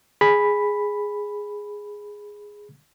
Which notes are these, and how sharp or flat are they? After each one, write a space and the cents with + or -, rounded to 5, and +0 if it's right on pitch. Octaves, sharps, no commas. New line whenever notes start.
G#4 +0 B5 +0